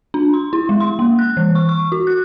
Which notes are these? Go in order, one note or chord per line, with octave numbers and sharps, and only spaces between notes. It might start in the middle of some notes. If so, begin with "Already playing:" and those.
D4
C6
E4
G#3
C6
A#3
F#6
E3
C#6
C#6
F#4
F#6